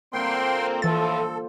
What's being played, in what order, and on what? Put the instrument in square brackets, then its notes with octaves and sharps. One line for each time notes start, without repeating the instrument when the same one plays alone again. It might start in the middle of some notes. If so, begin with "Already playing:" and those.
[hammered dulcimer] A#2 D3 G3 [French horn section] A#3 C4 [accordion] G5 C6
[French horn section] A2 F3 [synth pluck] E3 A6 [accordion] A4 [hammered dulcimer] C5